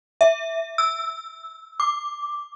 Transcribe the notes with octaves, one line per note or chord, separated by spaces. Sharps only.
E5
E6
D6